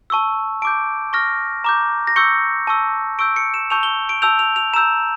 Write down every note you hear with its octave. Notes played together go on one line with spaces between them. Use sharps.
A5 C#6 E6
A5 D6 G6 D7
C#6 F6 A#6
A#5 D6 G6
A#6
C#6 E6 G6 C#7
A5 C#6 E6
C#6 E6 G6 D7
C#7
E7
A5 C#6 E6 G6 F7
G7
D7
A5 E6 G6 F7
F7
F7
A#5 E6 G6 E7